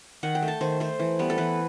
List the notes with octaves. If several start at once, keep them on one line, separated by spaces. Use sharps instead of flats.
D#3 F#5
G5
A3
A5
D#3 C5
A3 C5
E3
G3 B3
A4
E3 B4